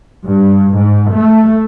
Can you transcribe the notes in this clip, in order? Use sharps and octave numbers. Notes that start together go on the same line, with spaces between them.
G2
G#2
A3